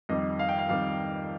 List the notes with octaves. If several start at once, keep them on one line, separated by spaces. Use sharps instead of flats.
F2 D#3 G3 D#5
F5
G5
F5
F2 D#3 G3 F5